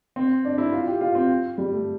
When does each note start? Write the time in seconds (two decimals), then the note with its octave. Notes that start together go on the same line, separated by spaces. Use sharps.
0.16 C4
0.45 D4
0.58 E4
0.72 F4
0.87 G4
1.01 F4
1.15 C4
1.58 G3
1.72 A3